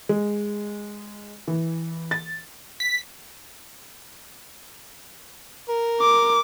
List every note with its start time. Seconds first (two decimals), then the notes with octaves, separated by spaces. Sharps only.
0.09 G#3
1.48 E3
2.11 A6
2.80 B6
5.69 A#4
6.01 D6